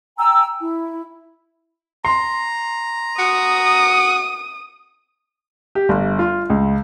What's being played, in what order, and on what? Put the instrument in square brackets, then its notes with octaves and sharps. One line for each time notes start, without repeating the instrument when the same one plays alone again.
[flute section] G5 G#5 A#5 E6
E4
[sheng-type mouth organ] A#5 [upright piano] C6
[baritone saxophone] F#4 [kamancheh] D#6
[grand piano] G4
G1
F4
C#2